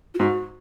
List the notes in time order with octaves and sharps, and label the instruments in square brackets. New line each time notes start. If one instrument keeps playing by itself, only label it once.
[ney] F4
[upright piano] G#2 [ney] F#4